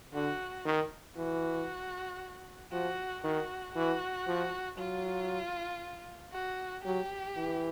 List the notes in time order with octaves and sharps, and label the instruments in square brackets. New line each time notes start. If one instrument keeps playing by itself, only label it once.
[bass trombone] D3 [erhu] F#4
[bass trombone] D#3
[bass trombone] E3 [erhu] F#4
[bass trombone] F3 [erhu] F#4
[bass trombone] D#3 [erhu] F#4
[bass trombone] E3 [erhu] F#4
[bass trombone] F3
[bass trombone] F#3 [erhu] F4
[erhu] F#4
[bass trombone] F#3 [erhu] G4
[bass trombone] E3